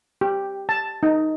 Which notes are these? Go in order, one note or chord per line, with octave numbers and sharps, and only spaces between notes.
G4
A5
D#4